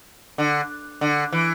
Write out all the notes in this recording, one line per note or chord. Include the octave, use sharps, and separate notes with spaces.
D3
D3
E3